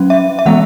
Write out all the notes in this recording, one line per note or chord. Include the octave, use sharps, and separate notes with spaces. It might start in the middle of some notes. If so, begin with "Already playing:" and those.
Already playing: F#3 C#4
E5
E5
E3 G#3 B3 F#5